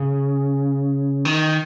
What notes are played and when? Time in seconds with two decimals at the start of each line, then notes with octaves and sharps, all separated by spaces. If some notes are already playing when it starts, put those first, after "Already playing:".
Already playing: C#3
1.25 D#3